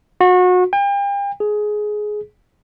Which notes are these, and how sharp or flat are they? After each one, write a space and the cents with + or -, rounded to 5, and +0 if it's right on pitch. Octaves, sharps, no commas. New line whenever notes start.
F#4 -30
G5 +40
G#4 +15